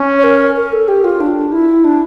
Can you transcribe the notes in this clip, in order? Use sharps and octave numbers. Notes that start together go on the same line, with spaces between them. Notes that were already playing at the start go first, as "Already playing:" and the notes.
Already playing: C#4
C#5
A#4
A#4
A4
G4
F4
D4
E4
D4